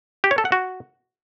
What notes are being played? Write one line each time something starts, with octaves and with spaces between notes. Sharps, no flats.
G4
C#5
A4
F#5
F#4